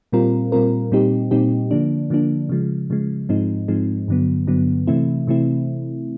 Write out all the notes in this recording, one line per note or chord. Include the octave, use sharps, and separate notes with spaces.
A#2 G3 C4 F4 A#4
A#2 G3 C4 F4 A#4
A#2 G3 C4 D#4 G4
A#2 G3 C4 D#4 G4
D3 F3 A#3 D4
D3 F3 A#3 D4
C#3 F3 G#3
C#3 F3 G#3
G#2 F3 G#3 C4 D#4
G#2 F3 G#3 C4 D#4
G2 D3 F#3 B3
G2 D3 F#3 B3
C3 E3 A3 C4 E4
C3 E3 A3 C4 E4